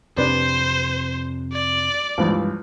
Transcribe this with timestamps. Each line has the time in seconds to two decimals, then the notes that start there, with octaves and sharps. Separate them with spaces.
0.17 F2 C3 D4 B4 C5 D5
1.52 D5
2.18 C#2 G2 E3 F3